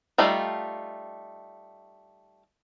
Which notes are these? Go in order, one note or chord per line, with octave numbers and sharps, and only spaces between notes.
G3 A3 D#4 F4